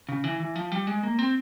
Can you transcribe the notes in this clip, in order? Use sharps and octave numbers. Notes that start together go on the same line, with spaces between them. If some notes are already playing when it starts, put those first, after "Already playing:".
C#3
E3
E3
F3
G3
G#3
A#3
C4